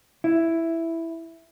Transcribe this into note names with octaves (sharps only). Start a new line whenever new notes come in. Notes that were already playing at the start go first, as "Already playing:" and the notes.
E4